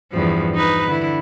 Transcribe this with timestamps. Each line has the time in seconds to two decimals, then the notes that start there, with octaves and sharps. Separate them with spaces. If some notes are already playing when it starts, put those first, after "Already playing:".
0.12 E2 G2 F3
0.55 D#4 B4
0.87 D3 E4